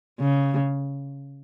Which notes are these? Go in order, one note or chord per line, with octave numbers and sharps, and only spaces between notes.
C#3